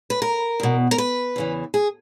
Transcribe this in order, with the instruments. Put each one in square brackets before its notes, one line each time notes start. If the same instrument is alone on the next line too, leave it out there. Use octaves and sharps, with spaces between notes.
[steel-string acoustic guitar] B4
A#4
E2 B2
A#4
B4
E2 C#3 E3
G#4